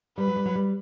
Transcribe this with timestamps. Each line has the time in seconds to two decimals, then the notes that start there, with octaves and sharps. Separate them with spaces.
0.18 G3 B4
0.27 F#3
0.36 G3
0.46 F#3
0.55 G3